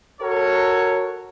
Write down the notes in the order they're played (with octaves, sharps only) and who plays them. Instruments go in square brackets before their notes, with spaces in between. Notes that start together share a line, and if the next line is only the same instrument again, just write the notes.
[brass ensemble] F#4 A4 A#4 C#5